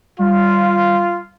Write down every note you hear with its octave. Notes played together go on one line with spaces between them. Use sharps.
G3 F4